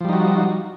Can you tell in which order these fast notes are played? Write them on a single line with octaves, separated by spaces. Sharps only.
F3 G3 D#4 F#4